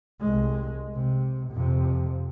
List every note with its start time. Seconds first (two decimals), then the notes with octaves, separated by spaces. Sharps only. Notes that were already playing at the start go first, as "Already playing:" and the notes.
0.21 C2 G#3
0.95 C3
1.51 F2 C3